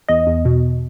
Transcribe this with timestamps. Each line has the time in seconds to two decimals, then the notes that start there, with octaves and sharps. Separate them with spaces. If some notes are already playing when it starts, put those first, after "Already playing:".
0.09 E2 D#5
0.27 E2
0.45 B2